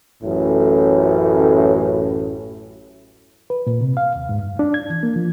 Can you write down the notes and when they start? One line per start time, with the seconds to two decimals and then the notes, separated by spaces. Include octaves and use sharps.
0.21 A1 F#2 A2
3.50 B4
3.67 A#2
3.81 C3
3.97 F5
4.16 D#2
4.29 G#2
4.43 G2
4.59 D4
4.74 G#6
4.90 E3
5.03 A#3
5.16 F3